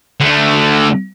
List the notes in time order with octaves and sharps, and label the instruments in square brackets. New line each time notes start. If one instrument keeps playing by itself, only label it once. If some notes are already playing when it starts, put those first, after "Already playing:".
[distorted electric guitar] D3 A3